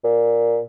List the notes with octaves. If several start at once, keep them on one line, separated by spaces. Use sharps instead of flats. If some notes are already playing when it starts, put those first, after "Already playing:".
A#2